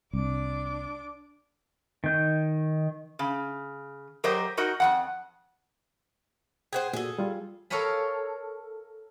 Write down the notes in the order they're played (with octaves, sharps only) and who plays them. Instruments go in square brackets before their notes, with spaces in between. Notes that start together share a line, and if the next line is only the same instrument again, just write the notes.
[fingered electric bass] C2 [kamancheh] D4 D6
[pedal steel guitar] D#3 G6
[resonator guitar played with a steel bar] C#3
F#3 G4 A#4 C5 D#5
D#4 F#4 A#4 D#5
F2 E3 F#5
[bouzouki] G#4 B4 C5 [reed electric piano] F#5 G5
[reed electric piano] A#2 F#4 [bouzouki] G#4 A4
[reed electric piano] G3 F4
[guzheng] A4 A#4 C#5 F5 G#5 B5